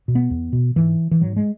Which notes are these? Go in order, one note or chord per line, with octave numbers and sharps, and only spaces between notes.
B2
B3
E2
B2
G#2 E3
E3
G#2 F#3
G#3